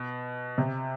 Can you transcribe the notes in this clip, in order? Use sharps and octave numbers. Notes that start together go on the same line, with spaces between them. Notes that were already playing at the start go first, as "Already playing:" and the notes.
Already playing: B2
C3